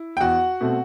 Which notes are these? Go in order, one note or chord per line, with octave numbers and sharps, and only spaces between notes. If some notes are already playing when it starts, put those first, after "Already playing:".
Already playing: E4
G5
E2 F#4 F#5
B2 A3 C4